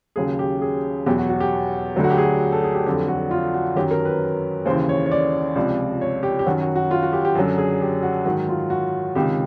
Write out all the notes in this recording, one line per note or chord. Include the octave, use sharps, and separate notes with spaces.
D#2 C#3 F#3 G#4
G4
G#4
E2 B2 F#3 G4
F#4
F#4
G4
D2 D3 F#3
F#4
G4
G#4
A4
G#4
G4
F2 D3 F#3 G4
F#4
F4
F#4
F#2 D#3 F#3 G4
A#4
B4
D#2 C#3 E3 C5
C#5
C#5
D5
C#2 C3 F3 D5
C#5
G4
G4
F#2 D#3 F#3 F#4
F#4
F#4
F4
F#4
G4
G4
F#2 D3 F#3
G#4
G4
F#4
G#2 D#3 F#3 F#4
F4
F#4
C#2 C3 D#3 G4